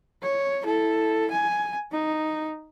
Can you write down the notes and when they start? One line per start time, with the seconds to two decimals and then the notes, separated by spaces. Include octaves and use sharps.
0.22 C#5
0.63 E4 A4
1.31 G#5
1.92 D#4